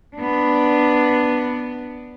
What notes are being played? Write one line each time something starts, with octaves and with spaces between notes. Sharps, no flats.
B3 D4